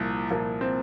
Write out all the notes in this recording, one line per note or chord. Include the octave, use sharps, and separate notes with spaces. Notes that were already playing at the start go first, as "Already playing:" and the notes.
Already playing: C2 A#2 F3
C2 A#2 F3 A#3
C4